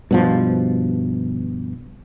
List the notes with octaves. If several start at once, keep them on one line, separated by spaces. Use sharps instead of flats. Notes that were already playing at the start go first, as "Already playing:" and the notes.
G2 B2 F3